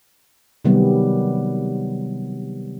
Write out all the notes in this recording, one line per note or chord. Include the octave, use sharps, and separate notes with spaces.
C3 D#3 F#3 G3 B3